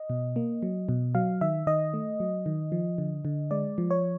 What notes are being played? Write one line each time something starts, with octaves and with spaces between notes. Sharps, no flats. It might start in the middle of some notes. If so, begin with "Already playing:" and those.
Already playing: D#5
B2
A#3
F#3
B2
F#3 F5
D#3 E5
D#3 D#5
A3
F#3
D#3
F3
D3
D3
G#3 D5
F3
C#5